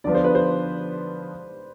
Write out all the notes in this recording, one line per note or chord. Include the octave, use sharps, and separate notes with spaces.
D3 F3 B3 D5
C5
B4
C5